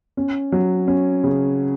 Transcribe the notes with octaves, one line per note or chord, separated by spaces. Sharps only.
C#4
F#3
C#4
C#3